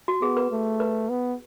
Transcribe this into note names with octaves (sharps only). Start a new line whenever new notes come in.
F#4
B3 G#4
B4
A3
B4
B3